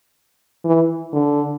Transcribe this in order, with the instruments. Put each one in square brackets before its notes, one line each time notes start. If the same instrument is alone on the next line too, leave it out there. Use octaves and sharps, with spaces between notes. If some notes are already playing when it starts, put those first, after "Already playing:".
[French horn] E3
D3